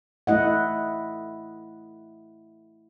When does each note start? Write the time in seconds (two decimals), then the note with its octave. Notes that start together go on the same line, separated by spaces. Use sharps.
0.27 A3 E4 D#5 F#5